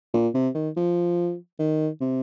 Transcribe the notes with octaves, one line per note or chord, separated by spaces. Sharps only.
A#2
C3
D#3
F3
D#3
C3